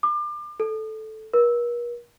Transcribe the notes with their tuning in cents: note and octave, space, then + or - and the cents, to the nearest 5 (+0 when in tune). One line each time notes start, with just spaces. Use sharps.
D6 +30
A4 -10
A#4 +45